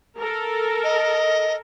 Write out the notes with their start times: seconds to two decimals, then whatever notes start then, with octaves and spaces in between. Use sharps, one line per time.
0.18 A4 A#4
0.84 D#5